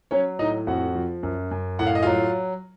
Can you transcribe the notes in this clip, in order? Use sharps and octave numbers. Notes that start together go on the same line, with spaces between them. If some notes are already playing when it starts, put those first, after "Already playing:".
F#3 C#4 C#5
A2 D#4 D#5
F2 F#4 F#5
F3
F#2
F#2
A2 F#5
F5
D#5
F#3 F4 F5